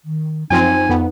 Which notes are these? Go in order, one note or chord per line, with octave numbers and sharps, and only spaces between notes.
D#3
F#2 F3 C4 D#4 G#5
F2 B3